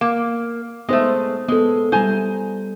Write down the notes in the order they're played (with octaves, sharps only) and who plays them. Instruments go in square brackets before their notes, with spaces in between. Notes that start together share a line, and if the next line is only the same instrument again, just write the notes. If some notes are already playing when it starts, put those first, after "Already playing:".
[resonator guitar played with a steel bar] A#3
[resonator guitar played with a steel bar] G#3 A3 [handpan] B3 D#4 C5
[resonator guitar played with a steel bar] G#3 [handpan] B3 A4
[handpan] G3 E4 [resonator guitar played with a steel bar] C5 G#5 A#5